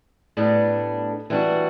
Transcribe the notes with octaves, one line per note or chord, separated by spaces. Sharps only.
A2 G3 B3 D4 A4
E3 G3 D4 F#4